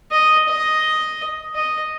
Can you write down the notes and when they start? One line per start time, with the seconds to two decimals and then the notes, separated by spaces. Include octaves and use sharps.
0.12 D#5
0.48 D#5
1.54 D#5